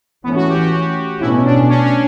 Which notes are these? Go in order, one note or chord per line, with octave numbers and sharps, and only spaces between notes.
E3 A3 B3 C#4
F#4
G4
G4
F#4
B2 A3 C#4 E4
D4
C#4
C#4